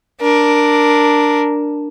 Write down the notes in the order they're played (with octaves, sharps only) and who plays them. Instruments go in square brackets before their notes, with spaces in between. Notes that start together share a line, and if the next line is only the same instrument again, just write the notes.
[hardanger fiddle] D4 A#4